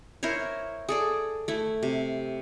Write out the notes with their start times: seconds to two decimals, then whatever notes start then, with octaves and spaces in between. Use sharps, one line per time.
0.23 E4 A#4 C5 C#5
0.89 G#4 A4 D5
1.48 A3 E4
1.83 C3